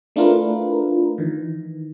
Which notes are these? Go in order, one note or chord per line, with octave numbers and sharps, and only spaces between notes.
A3 D4 E4 F4 A#4 B4
D#3 E3